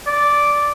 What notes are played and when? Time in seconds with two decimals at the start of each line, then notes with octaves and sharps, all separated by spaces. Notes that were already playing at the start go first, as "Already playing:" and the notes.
0.07 D5